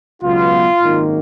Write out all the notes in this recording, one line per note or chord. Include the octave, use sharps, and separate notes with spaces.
C#2 B2 F#3 B3 F4
G#1 F#2 D#3 A#3